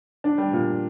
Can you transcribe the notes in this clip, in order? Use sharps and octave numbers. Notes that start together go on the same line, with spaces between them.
D4
G3
A#2